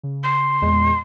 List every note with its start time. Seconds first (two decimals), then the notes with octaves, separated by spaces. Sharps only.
0.03 C#3
0.24 C6
0.62 E2 A#2 G#3